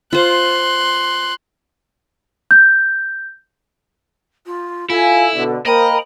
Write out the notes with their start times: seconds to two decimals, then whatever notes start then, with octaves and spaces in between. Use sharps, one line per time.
0.13 F4 C5 C6 F#6
2.51 G6
4.46 F4
4.90 E4 F4 A4 G#5
5.35 B2 D3
5.66 A#3 A#4 C5 D#5 G5 A#5 B5